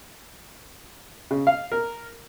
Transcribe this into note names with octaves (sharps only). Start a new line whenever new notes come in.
C#3
F5
A#4